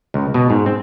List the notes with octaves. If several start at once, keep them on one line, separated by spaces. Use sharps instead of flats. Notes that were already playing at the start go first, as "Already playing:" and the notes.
C#2
B2
G#2
C4